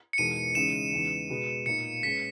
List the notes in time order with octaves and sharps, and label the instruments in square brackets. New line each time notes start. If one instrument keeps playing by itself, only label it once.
[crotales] C#7
[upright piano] E2 B2 G#3 D#4 A#4 [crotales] D#7
[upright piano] C#3 E3 G#3 D#4 [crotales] E7
[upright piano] E2 C#3 G#3 B3 D#4
B2 G#3 B3 F#4 B4
[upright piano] A#2 A#3 D#4 [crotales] C#7
[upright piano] G#3 C#4 G#4 B4 [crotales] B6